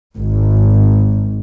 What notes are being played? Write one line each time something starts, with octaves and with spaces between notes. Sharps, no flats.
G#1